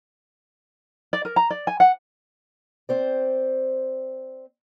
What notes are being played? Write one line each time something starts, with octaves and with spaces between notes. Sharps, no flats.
D5
A#4
A#5
D5
G#5
F#5
C4 C5 D5